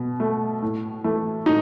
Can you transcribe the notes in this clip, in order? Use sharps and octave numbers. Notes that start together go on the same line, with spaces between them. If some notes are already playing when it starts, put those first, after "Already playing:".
Already playing: B2
A3
A2
E3 A3
A2 D#4